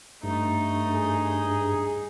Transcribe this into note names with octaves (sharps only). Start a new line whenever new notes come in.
G2 A3 D#4
G#4